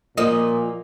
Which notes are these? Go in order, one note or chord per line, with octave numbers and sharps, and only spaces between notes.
A#2 F3 A#3 D#5